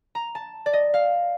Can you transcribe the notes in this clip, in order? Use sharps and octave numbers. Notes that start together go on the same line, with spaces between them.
A#5
A5
D5
D#5
F5